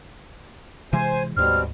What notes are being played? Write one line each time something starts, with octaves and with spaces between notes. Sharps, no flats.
C3 E3 G#3 C5 G#5
D2 G#2 B2 G3 C4 F6